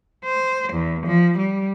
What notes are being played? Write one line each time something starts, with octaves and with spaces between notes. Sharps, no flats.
C5
E2
F3
G3